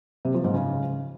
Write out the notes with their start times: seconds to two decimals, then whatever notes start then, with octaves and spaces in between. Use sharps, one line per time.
0.25 C3
0.34 F3
0.44 G#2
0.54 C#3